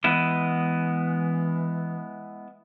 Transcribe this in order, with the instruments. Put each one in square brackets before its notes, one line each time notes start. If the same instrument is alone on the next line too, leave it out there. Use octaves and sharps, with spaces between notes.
[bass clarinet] E3 [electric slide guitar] G#3 B3 E4